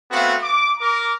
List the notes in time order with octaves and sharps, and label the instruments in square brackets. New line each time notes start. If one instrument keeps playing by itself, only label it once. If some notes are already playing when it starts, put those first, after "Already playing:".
[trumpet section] A3 B3 C4 F#4 F5
D6
A#4 A#5 D6